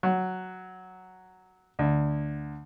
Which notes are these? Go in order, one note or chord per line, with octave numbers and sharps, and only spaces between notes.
F#3
D2